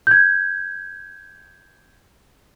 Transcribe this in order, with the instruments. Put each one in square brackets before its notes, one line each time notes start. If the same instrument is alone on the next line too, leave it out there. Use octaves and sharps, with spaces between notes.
[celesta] G6 G#6